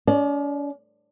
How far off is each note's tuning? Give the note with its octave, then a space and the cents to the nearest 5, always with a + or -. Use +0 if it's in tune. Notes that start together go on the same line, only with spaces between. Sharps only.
C#4 +45 D5 +25